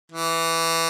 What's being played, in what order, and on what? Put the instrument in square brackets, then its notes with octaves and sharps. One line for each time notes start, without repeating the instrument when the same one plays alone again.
[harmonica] E3